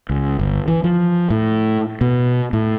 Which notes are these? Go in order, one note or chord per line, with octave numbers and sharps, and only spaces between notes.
C#2
G1
E3
F3
A2
B2
A2